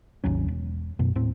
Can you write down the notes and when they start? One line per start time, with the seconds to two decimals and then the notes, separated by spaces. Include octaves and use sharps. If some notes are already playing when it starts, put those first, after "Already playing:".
0.24 G#1 D#2 F#3 C#4
0.48 E1
0.99 F#2 B2
1.15 D#1 A2 C4